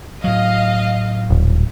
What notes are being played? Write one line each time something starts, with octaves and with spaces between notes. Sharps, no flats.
A2 F#3 D#5 F5
D#1